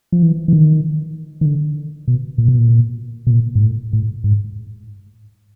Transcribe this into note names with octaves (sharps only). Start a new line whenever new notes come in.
F3
E3
E3
D#3
D#3
D3
B2
A#2
B2
A#2
B2
A#2
G#2
A2
A2
G#2